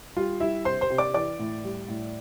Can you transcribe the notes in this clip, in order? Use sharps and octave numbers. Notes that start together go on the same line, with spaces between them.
G3 F4
G3 E4 E5
C3 C5 C6
C5 C6
C3
D5 D6
E3 D5 D6
A2
G3
A2